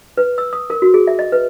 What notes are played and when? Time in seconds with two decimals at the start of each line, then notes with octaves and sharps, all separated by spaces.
0.17 B4
0.38 E6
0.53 D#6
0.70 A#4
0.82 F#4
0.94 G#4
1.07 E5
1.19 D#5
1.32 B4